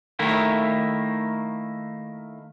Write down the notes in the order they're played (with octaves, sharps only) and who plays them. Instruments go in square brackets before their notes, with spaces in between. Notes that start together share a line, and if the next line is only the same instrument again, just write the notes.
[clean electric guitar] D#3 A3 A#3 E4